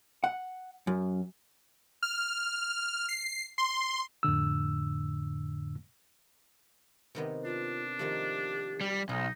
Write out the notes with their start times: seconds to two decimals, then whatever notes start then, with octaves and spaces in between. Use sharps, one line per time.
0.24 F#5
0.87 F#2
2.03 F6
3.09 C7
3.58 C6
4.23 F2 A2 D3 E6
7.15 C3 D#3 B3
7.45 D4 F4
7.99 D#3 F3 A3 G4
8.81 G3
9.09 B1 D#4 G#4